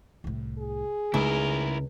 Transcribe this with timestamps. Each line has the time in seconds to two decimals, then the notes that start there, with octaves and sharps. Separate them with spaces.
0.24 C2 A2
0.59 G#4
1.14 C#2 A3 D#4 E4 A#4